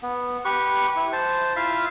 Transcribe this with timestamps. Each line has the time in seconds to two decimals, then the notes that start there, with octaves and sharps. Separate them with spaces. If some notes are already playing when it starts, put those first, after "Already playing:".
0.02 B3
0.45 G4 B4 C#6
0.96 E4
1.12 C5 A5
1.56 E4 F4 E5 F5